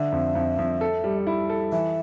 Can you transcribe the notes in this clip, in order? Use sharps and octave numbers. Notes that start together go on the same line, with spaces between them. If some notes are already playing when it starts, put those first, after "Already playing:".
Already playing: D3 E5
F2
F2
F2
A4
G3
E4
A4
E3 E5